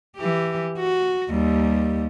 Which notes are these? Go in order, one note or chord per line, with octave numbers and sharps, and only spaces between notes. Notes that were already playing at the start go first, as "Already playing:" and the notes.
E3 G4
F#4
D#2 G3